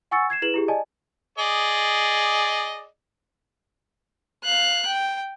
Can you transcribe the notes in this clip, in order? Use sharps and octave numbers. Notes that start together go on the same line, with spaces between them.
F#5 G#5 C#6 E6 A6 C#7
G#6 C7 E7
E4 G#4 B4 E7 F#7
E4 G4 G#4
D5 D#5 G#5 A5
G#4 D5 D#5
F5 F#6
G5